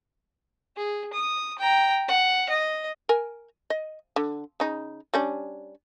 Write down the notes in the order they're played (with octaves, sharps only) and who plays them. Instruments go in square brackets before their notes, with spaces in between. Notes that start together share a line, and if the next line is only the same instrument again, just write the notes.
[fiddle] G#4
D#6
G5 A#5
F#5
D#5
[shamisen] A#4 G#5
D#5
D3
C#3 D#4
G3 C#4 D4